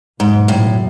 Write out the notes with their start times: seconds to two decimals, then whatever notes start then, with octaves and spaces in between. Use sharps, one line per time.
0.20 F#1 E2 G#2 B2 F#3
0.48 A2